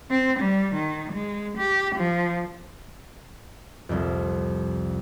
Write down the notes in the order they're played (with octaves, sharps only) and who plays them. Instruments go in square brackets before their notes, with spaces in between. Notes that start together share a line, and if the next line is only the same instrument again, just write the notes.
[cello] C4
G3
D#3
G#3
G4
F3
[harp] C2 F2